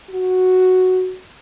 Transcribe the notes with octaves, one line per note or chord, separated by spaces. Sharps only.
F#4